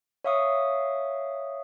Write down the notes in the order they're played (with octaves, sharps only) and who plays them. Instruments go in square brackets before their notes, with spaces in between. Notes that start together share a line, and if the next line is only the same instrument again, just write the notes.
[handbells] C#5 E5 F5 C#6 D#6